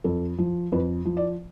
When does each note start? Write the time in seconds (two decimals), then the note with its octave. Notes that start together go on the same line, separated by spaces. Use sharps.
0.04 F2 A4
0.38 F3
0.72 F2 B4
1.05 F3
1.17 D5